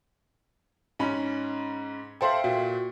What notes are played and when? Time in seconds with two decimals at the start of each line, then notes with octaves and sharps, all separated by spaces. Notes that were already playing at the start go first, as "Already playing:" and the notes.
0.99 G#2 C#4 B5
2.21 A4 C5 E5 F5 G5 C6
2.44 A#2 F#4